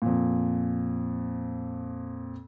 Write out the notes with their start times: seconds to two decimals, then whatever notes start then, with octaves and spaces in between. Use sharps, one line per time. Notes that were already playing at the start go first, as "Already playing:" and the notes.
0.02 F2 A#2